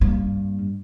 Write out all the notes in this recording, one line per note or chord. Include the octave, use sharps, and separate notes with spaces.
G2 A#3